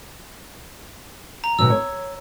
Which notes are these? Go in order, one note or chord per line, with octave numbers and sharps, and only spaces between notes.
A#5
B2 D#3 F#3 E6
C#5